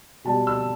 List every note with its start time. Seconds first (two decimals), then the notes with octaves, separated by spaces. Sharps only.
0.24 B2 G3 A5
0.47 E6